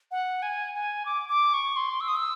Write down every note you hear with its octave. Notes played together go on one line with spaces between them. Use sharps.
F#5
G#5
G#5
D6
D6
C#6
C6
E6
D#6
E6